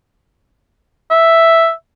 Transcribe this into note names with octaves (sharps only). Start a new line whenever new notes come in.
E5